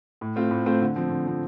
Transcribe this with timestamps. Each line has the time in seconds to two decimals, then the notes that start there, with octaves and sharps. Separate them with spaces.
0.21 A2
0.36 A3 C4 F4 C5
0.51 A2
0.66 A3 C4 F4 C5
0.81 D3
0.96 F3 C4
1.11 D3
1.26 F3 C4